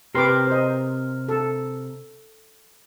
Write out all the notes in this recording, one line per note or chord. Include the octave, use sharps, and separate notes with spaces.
C3 G4 A#4 B4 C6 D6
C5 D#5
A4